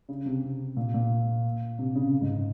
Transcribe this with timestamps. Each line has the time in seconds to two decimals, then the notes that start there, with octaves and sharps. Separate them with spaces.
0.09 C#3
0.26 C3
0.43 C3
0.77 A#2
0.94 A#2
1.79 C3
1.95 C#3
2.21 G#2